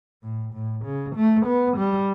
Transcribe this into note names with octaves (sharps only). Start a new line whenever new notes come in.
A2
A2
C#3
A3
B3
G3